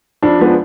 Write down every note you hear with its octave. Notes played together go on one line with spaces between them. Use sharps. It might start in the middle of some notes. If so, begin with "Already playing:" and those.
F2 D4
F3 G#3 B3 D4